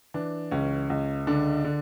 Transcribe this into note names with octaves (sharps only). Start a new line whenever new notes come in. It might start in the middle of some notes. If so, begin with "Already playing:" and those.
E3 D4
C#2 C#4
C#2
D3 D4
D3